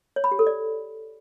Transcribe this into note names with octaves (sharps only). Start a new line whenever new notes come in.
C#5
B5
G4
A4
D5